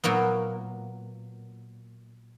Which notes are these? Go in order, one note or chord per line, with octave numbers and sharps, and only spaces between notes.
A#2 F#3 A#3 B3